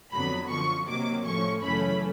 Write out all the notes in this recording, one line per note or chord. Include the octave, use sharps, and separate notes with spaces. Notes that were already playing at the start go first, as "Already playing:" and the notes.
F2 D3 F#3 B3 B5
F#2 D3 F3 C#6
C3 D#3 F#3 A#3 D6
A2 F3 A3 C#4 C#6
F#2 C#3 E3 A3 C#4 B5